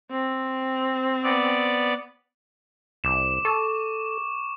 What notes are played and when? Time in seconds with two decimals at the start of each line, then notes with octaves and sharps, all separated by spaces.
0.11 C4
1.23 B3 D5
3.04 C2 D6 E7
3.45 A4 C#6